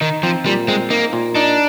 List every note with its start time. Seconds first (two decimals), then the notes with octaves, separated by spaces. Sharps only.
0.01 D#3 D#4
0.23 F3 C4
0.45 A#2 G3
0.68 G#3 C4
0.90 A#3 D#4
1.13 A#2
1.35 D4 D#4